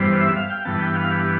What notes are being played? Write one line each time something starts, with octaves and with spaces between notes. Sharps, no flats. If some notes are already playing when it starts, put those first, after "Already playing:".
Already playing: G2 E3 G3 B3 C5
E5
F5
G5
G2 E3 B3 A5
G5
F5
G4